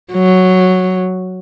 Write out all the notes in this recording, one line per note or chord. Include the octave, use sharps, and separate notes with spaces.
F#3